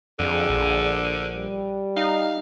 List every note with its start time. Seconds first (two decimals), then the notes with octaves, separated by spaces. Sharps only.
0.19 F2 D3 G#4
0.49 A#1
1.35 G3
1.97 D#4 F5